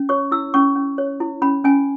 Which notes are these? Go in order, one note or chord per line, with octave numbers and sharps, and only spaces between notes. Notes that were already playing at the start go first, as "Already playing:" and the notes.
Already playing: C#4
C#5 C#6
E4 E6
C#4 C#6
C#4
C#5
E4
C#4 B5
C#4 G#5